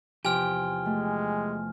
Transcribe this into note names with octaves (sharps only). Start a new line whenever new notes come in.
E2 C3 F3 G4 G#5 F6
G#3 A3